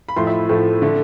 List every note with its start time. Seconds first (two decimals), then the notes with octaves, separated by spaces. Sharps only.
0.09 B5
0.16 A2 F3 A3 C6
0.27 E5
0.49 A2 F3 A3
0.82 D3 A3